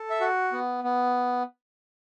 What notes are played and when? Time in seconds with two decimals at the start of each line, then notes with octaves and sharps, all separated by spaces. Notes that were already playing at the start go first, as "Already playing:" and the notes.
Already playing: A4
0.10 E5
0.21 F#4
0.52 B3
0.84 B3